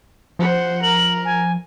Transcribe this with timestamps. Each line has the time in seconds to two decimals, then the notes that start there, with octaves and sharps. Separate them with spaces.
0.39 F3 C5 F#5
0.83 A#4 F#7
1.25 G#5